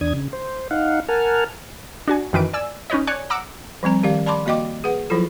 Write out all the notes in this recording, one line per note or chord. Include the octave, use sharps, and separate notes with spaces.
E2 D4 D#6 G#6
C#3
C5
D#4 F5 F#5
A#4 F#5 G#5 A5 F6
D4 F#4 G#5
F#2 D#3 E3 B4 D7
D5 G#5 E6
C#4 D#4 B4 C#5 D#5
C#5 D5 G#5 F#6
F#5 A#5 D6 E6
F3 G3 C4 A#5
D#3 G4 D5 F5
D5 A5 B5 C6 D6
A#3 F#4 D#5 G5 D6
G#4 B4 F#5
F3 F#3 E4 F4 A4